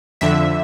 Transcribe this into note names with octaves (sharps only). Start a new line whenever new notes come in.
F2 D3 E5